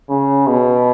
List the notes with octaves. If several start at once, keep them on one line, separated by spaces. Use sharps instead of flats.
C#3
B2